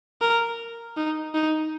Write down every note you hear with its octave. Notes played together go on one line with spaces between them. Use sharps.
A#4
D#4
D#4